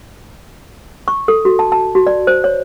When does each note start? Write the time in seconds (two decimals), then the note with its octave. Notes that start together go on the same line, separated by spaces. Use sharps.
1.08 C#6
1.28 A4
1.45 F#4
1.59 A5
1.72 A5
1.95 F#4
2.07 D5
2.27 C5
2.44 C#5